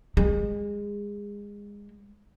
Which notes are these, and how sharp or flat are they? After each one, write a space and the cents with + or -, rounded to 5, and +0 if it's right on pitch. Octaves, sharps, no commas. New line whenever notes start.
G#3 -25